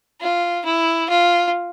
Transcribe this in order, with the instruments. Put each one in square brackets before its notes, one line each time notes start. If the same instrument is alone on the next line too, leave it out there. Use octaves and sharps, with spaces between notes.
[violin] F4
E4
F4